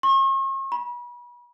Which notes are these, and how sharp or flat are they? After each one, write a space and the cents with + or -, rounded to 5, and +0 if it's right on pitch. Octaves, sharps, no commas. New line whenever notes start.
C#6 -45
B5 -35